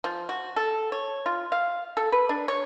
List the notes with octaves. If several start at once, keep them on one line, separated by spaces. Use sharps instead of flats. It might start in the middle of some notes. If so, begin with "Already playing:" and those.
F3
F#4
A4
C#5
F4
F5
A4
B4
D4
C#5